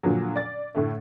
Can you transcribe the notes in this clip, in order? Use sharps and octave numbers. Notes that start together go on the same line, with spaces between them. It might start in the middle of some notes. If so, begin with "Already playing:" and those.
A#2 D3 F3 F#3
D5 A6
A2 D3 A3